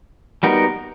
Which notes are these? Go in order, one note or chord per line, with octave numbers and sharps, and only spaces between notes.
G3 B3 D#4 F#4 A#4